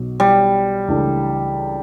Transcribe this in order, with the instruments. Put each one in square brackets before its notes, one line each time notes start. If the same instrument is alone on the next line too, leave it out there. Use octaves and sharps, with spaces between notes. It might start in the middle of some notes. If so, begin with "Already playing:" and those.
Already playing: [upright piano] B1 B2 F#3
[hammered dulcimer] G3
[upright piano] C#2 C#3 E3 A3 D4